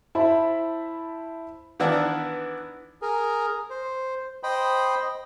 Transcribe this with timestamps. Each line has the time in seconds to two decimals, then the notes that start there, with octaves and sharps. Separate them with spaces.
0.15 E4 C5 E5 A5 B5
1.80 D#3 E3 B3 D4 E4
3.02 G#4 A#4
3.70 C5
4.43 C5 D#5 G5 B5